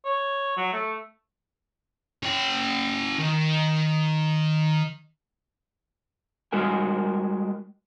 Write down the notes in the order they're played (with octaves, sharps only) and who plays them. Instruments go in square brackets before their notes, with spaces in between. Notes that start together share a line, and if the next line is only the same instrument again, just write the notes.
[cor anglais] C#5
F#3
A3
[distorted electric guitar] C#4 G5
D#3
[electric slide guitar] G3 G#3 F#4 A#4 G#5